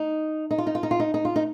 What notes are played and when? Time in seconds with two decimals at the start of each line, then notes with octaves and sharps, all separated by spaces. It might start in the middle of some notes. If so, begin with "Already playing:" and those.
Already playing: D#4
0.51 D#4
0.58 F4
0.67 D#4
0.75 F4
0.83 D#4
0.91 F4
1.00 D#4
1.14 D#4
1.25 F4
1.36 D#4